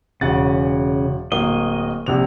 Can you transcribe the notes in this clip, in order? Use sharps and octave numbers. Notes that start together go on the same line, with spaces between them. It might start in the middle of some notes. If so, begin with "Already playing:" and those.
E1 C#3 F#5 A6
D1 A#3 D#5 G7
A#1 C3 F7